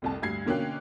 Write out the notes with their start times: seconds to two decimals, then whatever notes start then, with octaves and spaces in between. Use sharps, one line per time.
0.02 F1 C2 A5
0.22 D2 G2 G#6 C7
0.46 B2 D3 A#3 C#4 G5 F#6